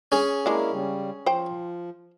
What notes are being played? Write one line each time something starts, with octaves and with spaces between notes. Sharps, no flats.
C#4 G#4
G#3 A#3 D4 E4 A#4
C#3 G3
F3 C5 G5